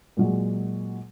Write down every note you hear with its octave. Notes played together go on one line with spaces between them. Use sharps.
A#2 F#3 G#3